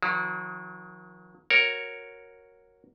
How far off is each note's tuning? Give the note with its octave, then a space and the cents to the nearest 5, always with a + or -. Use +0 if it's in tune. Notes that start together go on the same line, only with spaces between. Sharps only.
D#3 +35 F#3 -40
F#4 -5 A#4 +0 C#5 -5